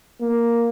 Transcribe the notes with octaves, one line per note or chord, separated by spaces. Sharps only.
A#3